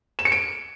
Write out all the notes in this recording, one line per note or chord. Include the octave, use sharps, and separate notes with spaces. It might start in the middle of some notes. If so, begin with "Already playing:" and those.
E7
C#7
D7